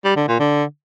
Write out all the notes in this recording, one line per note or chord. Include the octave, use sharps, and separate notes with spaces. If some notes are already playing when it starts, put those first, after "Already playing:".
G3
D3
A#2
D3